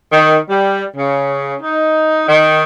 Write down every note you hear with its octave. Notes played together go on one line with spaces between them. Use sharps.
D#3
G3
C#3
D#4
D#3